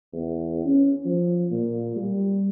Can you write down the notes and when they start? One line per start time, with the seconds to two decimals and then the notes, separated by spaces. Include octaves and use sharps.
0.13 E2
0.65 C#4
1.05 F3
1.51 A#2
1.96 G3